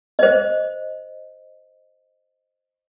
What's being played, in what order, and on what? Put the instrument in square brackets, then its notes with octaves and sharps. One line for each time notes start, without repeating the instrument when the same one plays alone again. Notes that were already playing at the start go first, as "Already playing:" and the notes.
[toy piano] C5 D#5